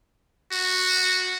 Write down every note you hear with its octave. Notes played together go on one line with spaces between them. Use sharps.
F#4